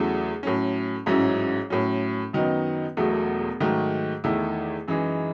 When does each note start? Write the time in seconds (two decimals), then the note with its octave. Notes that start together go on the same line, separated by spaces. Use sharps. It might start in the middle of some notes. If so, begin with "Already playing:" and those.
Already playing: E2 C#3 F#3 A3 E4
0.43 A2 F#3 C#4
1.06 A1 G#2 F#3 C#4 E4
1.70 A2 F#3 C#4
2.33 F#2 D#3 F#3 B3 D#4
2.97 E1 E2 B2 F#3 A3
3.60 G#2 D#3 F#3 A3
4.24 E2 D#3 A3 E4
4.88 F#2 E3 G#3 D#4 G#4